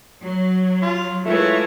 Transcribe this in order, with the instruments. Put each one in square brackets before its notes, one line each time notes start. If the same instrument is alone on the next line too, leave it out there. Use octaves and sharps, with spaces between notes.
[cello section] F#3
[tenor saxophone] F4
[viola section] E3 G#3 C#5 [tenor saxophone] A3 [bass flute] F4